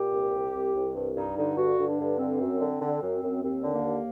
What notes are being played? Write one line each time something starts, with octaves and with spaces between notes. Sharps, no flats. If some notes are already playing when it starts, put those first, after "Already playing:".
Already playing: A#2 G4
C2
C2
C2
C2
G2
G2 D#4
D3 D#4
G2 F#4
D3
D4
G2
D3 C4
F#2
D3
D3
F#2
F#2
D#2 C4
D3
A#3
D#2